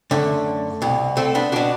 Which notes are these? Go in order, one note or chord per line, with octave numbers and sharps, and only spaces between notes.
F#2 D3 A3
C2 B2
A3 C4
B3 D4
B2 D4 F#4